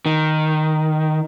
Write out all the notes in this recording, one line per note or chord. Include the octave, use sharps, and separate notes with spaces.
D#3